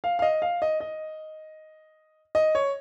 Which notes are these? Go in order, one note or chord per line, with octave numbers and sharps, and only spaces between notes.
F5
F5
D#5
F5
D#5
D#5
D#5
C#5